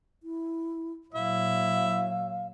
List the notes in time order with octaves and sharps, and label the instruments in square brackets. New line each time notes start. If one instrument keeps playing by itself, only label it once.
[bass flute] E4
[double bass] A#2 F#3 [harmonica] E4 E5 [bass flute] F5